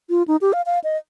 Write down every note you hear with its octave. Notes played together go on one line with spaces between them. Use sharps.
F4
D#4
G4
F5
F5
D#5